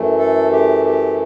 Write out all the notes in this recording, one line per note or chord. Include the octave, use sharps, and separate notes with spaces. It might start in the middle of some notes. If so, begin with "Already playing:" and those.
Already playing: F#2 E3 A3
A4
G4
G4